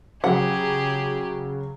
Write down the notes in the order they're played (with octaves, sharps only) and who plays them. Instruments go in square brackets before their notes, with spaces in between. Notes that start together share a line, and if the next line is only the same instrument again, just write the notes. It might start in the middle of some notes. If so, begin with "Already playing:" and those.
[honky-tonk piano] C#3 F#3 [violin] G4 G#4 [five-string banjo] F#5